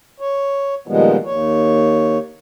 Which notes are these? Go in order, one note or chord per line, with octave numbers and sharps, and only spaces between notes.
C#5
A#2 D#3 F3 G3 G#3 B3
D#2 C#5